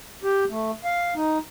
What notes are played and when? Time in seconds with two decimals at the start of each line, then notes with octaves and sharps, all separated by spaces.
0.23 G4
0.50 A3
0.84 F5
1.15 D#4